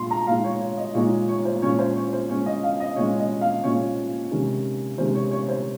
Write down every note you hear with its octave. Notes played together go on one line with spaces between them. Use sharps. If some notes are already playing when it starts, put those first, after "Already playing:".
Already playing: A#2 G#3 C6
A#5
A#2 G#3 D#4 F5
C#5
C#5
D#5
A#2 G#3 D#4 C#5
C#5
C5
A#2 G#3 C#4 C#5
C5
C#5
C5
A#2 G#3 C#4 C#5
D#5
F5
D#5
A#2 G#3 C#4 C#5
D#5
F5
A#2 G#3 C#4 C#5
C3 D#3 G#3 C#4
C3 D#3 G#3 C#4 C5
C#5
C#5
C5